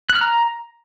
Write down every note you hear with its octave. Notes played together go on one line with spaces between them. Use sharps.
F#6
F6
A#5